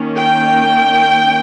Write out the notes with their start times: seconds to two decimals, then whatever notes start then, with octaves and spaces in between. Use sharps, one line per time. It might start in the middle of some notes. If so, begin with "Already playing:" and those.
Already playing: D#3 A#3 C#4
0.17 G5